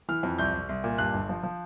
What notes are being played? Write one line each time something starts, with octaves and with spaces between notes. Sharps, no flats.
E3 F6
F2
C2 G6
C2
C2
A#2
G2 F#6
G1
F3
F3